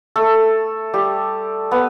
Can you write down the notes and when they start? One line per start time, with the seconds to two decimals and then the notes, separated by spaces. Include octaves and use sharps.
0.16 A3 A4
0.94 G3 G4
1.71 B3